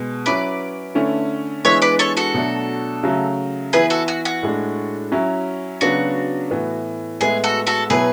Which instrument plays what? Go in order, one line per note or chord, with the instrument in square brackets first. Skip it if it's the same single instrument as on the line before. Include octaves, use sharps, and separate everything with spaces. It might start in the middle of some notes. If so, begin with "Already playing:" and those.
Already playing: [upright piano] B2 G#3 B3
[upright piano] F#3 C#4 E4 [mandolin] B4 D5
[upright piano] D3 A3 C#4 E4
[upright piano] E3 G#3 B3 D4 [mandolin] C#5 E5
[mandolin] B4 D5
A4 C#5
F#4 A4
[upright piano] B2 F#3 A3 D4
C#3 F#3 A3
[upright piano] E3 B3 E4 [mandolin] G#4 B4
[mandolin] F#4 A4
F#4
F#4
[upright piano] A2 G#3 D4
F#3 C#4 E4
[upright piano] C#3 F#3 B3 D4 [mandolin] F#4
[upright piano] A2 E3 B3 E4
[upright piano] A2 G#3 B3 E4 [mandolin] G#4
[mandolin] F#4 A4
F#4 A4
[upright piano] B2 F#3 B3 E4 [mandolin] G#4 B4